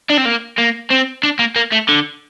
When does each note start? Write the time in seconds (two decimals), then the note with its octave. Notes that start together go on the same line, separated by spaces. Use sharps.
0.10 D4
0.18 C4
0.26 A#3
0.58 A#3
0.91 C4
1.23 D4
1.39 A#3
1.56 A#3
1.72 A3
1.88 D3